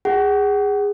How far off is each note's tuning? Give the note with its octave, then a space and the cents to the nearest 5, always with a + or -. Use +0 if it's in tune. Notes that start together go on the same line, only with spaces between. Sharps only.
G#4 -20 F#5 +30